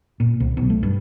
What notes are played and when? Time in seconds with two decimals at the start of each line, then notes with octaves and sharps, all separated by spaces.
0.20 A#2
0.40 C2
0.57 B1
0.70 A3
0.83 G2